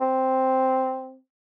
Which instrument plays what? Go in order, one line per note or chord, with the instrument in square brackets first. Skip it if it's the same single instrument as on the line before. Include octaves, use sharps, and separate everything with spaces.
[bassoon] C4